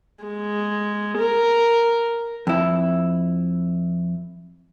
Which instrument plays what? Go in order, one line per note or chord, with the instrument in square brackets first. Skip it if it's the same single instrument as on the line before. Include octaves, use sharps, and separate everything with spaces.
[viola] G#3
A#4
[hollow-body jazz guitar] F2 E4